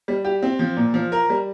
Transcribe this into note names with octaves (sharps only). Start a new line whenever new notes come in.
G3
G4
C4
F3
A#2
F3
A#4
G3